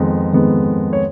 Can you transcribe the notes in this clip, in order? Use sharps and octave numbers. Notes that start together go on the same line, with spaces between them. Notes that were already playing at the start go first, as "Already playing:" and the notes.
Already playing: F2 D#3 G#3 B3
F2 D#3 G#3 B3
C#5